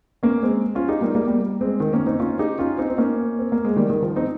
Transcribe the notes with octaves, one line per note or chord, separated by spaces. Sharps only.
A#3 C#4
G#3 C4
C#4 F4
D#4 G4
G3 A#3
G3 A#3
G3 A#3
G#3 C4
D#3
A#3 C#4
C4 D#4
C#4 F4
D#4 G4
C#4 F4
C4 D#4
C4
A#3 C#4
C4
A#3
G#3
D#3 G3
D#3
F3
C4 D#4